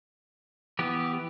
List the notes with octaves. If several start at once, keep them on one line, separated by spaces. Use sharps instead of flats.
E3 B3 G4